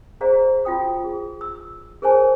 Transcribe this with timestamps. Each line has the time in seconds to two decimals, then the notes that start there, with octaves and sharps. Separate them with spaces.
0.21 G#4 C5 D5 F5 A#5
0.65 F4 F#4 G5 D#6
1.04 G#4
1.41 E6
2.02 G#4 A#4 C5 C#5 G#5 A5